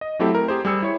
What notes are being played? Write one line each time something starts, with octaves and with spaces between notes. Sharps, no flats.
D#5
F#3 A3 C4 E4 G4 A4
A#4
G4 G#4 C5
G3 G#4 E6 C#7
E4 C#5